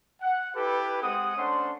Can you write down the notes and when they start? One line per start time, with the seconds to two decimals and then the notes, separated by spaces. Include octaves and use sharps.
0.22 F#5
0.56 E4 G4 A4 B4
1.02 G#3 C4 G4 F#5 D#6
1.36 A3 C#4 D4 C5 F#5 C6